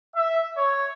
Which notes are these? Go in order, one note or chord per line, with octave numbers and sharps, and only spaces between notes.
E5
C#5